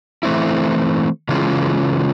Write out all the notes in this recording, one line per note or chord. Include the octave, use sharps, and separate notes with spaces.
E3 A3 C4 E4
C#3 E3 G#3 C#4 F4